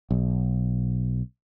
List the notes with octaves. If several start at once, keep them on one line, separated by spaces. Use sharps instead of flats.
B1